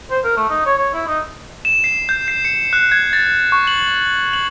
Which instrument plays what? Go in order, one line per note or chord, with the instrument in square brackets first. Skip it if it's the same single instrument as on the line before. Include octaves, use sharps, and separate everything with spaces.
[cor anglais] C5
A#4
A3
D#4
C#5
C#5
E4
D#4
[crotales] E7
C7
G6
C7
C#7
F#6
G#6
A6
C#6
F#7
F#7